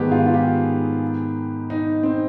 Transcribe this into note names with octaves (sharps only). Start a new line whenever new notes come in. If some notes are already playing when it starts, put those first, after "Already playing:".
Already playing: G#2 D#3 B3 G4 G#4
F4
F4
G4
D#4
C4